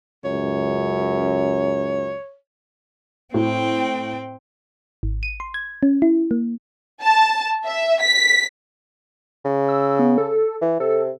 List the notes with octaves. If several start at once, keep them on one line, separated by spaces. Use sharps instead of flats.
C#2 F#2 C#5
A2 C4 G5
G#1
D#7
C6
G#6
C#4
E4
A#3
A5
E5
B6
C#3
E6
B3
A4
E3
C3 A4